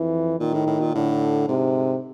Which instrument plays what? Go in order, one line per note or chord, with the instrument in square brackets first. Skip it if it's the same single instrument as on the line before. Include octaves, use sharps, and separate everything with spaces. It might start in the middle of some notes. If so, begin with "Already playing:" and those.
Already playing: [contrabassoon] F2 [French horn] E3
[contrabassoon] A#2 [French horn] D#3
[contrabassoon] A2
A2
A#2
[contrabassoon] A2 [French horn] D3
[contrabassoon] G#2 [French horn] C3